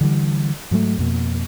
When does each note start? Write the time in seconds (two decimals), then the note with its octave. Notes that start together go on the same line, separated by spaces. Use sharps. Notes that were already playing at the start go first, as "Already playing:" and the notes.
0.01 D3 E3 G3
0.71 G#2 F#3 G3 A3
0.98 F2 B2 A#3